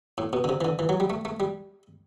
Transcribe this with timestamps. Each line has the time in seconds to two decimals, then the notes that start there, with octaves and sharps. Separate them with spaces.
0.18 A2
0.33 B2
0.44 D3
0.49 C3
0.61 E3
0.65 D3
0.79 E3
0.89 F#3
1.00 G3
1.10 A3
1.25 A3
1.40 G3